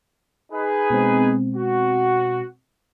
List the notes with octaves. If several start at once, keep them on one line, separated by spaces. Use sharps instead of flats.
D#4 G#4 B4
B2 G#3 C4
F#4